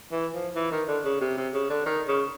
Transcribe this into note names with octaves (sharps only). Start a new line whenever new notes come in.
E3
F3
E3
D#3
D3
C#3
C3
C3
C#3
D3
D#3
C#3